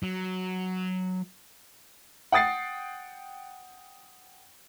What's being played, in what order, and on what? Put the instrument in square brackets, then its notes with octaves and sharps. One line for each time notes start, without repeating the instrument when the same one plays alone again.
[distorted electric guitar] F#3
[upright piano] F#5 G5 D#6 A6 C7